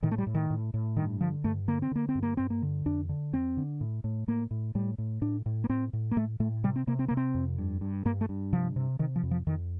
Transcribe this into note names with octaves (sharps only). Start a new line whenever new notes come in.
A2 D#3
A3
G3
A2
D#3
A2
A2
G2 D#3
D3 F3
G2 A3
D3 A#3
C4
D3 A#3
C4
G2
A#3
G2 C4
A#3
D3
F2 D4
D3
F2 C4
D3
A2
A2
A2 A#3
A2
A2 G3
A2
A2 D4
A2
A#3
A2 C4
A2
A#3
A2 A3
A2 A3
C3 G3
C4
C3 A#3
C4
C3 A#3
C4
F2
G2
G2
G2 A#3
A3
G2
C3 F3
C3
C3 D#3
F3
F2
F3
F2 D#3